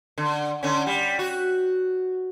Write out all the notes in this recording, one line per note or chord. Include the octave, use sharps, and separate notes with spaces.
D3
D3 C#4
G3
F#4